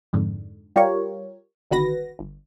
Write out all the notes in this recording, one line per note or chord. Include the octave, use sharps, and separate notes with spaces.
F2 G#2 D3
G3 F4 G4 A#4 C#5
G1 D2 D#3 F#4 B4 A#6
G1